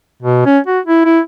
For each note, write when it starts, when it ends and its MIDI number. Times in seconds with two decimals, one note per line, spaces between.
0.23 0.43 47
0.46 0.59 61
0.67 0.80 66
0.86 1.02 64
1.05 1.20 64